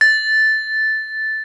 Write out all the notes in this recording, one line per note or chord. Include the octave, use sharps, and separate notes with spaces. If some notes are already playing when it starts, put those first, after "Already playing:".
A6